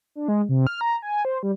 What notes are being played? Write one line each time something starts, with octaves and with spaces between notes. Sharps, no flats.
D4
G#3
C3
F6
A#5
G#5
C5
G3